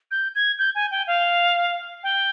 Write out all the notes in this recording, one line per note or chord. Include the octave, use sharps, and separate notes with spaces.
G6
G#6
G6
G#5
G5
F5
G5